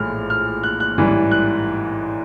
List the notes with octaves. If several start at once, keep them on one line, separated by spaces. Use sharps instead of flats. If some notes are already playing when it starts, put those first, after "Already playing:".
Already playing: A#1 A2 E3 G#3 F6
F6
F#6
F#6
A1 G#2 E3 G3
F#6